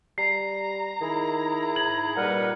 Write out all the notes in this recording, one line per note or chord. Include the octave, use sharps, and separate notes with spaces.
G3 A#5 C7
D#3 E4 G#4
G#2 G#6 F#7
A#2 G3 D#4 A#4 B4 F#5